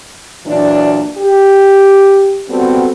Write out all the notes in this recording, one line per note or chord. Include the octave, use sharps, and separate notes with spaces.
A#2 E3 F#3 D4
G4
G3 B3 C4 F#4 A4